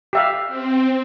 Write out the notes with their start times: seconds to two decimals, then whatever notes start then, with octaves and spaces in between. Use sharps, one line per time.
0.13 G4 E5 F5
0.48 C4